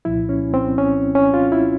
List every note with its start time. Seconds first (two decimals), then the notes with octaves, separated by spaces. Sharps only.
0.05 C2 A#2 F3 E4
0.29 C#4
0.54 C4
0.78 C#4
1.15 C#4
1.34 F4
1.52 E4